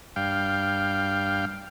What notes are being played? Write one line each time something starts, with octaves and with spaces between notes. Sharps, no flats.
G2 F5 G5